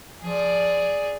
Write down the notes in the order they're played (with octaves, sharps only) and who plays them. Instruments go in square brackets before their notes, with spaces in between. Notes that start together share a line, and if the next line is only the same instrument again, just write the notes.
[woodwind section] F3 [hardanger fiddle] G#4 D5